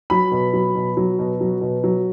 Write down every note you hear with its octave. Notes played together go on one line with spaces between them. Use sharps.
F#3 B5
B2
F#3
B2
F#3
B2
F#3
B2
F#3